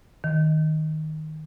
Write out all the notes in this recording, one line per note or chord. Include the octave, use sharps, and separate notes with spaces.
D#3